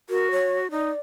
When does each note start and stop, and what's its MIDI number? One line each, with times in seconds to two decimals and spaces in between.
0.10 0.71 66
0.10 0.29 70
0.31 0.57 73
0.71 0.90 63
0.71 1.00 74